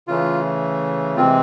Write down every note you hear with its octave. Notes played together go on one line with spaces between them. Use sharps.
C#3 E3 A3 F4
C3 E3 G#3 C4 F4